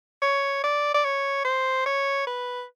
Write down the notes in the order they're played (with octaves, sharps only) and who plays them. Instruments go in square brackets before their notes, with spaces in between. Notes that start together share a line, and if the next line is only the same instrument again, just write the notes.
[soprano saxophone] C#5
D5
D5
C#5
C5
C#5
B4